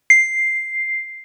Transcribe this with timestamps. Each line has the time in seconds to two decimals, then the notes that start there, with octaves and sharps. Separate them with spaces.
0.10 C7